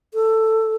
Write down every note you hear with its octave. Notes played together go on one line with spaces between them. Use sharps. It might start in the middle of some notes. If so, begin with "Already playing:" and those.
A4